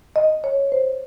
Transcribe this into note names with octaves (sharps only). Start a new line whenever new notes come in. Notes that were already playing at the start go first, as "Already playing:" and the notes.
D#5
C#5
C5